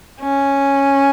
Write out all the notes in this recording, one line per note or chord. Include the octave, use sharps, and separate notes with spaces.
C#4